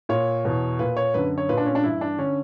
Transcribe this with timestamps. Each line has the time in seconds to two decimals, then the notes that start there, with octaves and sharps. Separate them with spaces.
0.09 A#2 C#5
0.45 E2 B2
0.79 A#2 B4
0.97 C#5
1.14 F#2 D3 B4
1.38 C#5
1.49 A#2 B4
1.57 D4
1.66 C#4
1.75 D4
1.84 G2 E3 E4
2.01 D4
2.18 D3 C#4